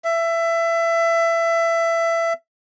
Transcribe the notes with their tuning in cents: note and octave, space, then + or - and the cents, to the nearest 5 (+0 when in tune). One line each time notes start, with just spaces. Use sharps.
E5 +20